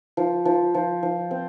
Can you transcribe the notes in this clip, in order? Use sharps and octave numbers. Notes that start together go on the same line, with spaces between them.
F3
F3
F3
F3
C4